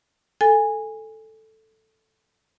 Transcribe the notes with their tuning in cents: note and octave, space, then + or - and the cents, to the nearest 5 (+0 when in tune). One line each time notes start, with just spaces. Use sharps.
A4 +0 G#5 -15